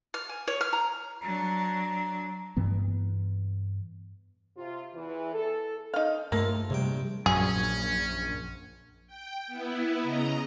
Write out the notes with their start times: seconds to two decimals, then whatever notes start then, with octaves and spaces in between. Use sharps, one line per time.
0.14 F6
0.29 G#5
0.48 C#5
0.61 F6
0.73 A#5
1.22 F#3 D4 A#5
2.57 G2 E3 B3
4.57 C3 F4
4.94 E2 E3
5.34 A4
5.94 D#4 F5
6.32 G2 A3 A#3 F4 A4
6.70 A#1 G2 C3 G5
7.26 A#1 F#2 C#4 G#4
9.07 G5
9.47 B3 E4
10.02 C#3 D#5 A#5